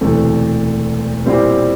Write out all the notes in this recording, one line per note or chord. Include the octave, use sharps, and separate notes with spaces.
E1 D2 C3 E3 A3
A#2 G3 C4 E4 G4